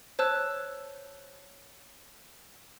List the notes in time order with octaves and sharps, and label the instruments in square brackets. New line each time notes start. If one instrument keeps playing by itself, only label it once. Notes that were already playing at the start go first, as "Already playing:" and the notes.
[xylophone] C5 C#5 A5 E6 F#6